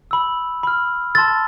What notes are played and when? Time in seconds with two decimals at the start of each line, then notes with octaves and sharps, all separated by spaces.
0.11 B5 E6
0.63 B5 F6
1.15 A5 C6 E6 A6